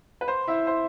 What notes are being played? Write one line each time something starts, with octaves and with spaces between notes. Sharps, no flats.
B4
C5
E4 E5
C5